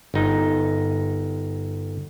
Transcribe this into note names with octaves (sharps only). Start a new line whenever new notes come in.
G1 D#4